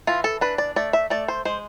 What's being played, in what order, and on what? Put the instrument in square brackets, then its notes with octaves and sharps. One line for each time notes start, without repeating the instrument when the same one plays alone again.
[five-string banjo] E3 F4
A4
D4 B4
D5
A3 D5
E5
A3 D5
C5
G#3 C5